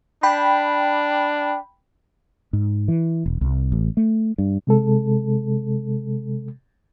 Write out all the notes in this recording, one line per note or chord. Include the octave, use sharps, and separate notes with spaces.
D4 G5 B5
G#2
E3
E1
C2
A1
A3
G2
C3 G#3 A4